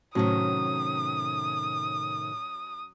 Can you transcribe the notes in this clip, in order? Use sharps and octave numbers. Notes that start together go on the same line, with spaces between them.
A2 C3 D#3 F#3 C#4 D#6